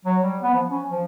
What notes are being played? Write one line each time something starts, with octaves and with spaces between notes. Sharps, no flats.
F#3
G3
B3
F3
C#4
F3